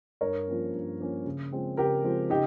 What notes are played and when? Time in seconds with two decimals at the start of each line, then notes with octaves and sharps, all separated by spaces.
0.21 G2 A#4 C#5
0.48 F3 A#3 C#4
0.73 G2
1.00 F3 A#3 C#4
1.25 C#3
1.52 F3 G#3 C4
1.77 C#3 G4 A#4
2.04 F3 G#3 C4
2.30 C#3 D#4 G4